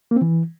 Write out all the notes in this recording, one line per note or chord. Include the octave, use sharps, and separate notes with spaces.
A#3
C4
E3